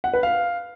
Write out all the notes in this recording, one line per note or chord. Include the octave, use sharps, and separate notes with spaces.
F#5
B4
F5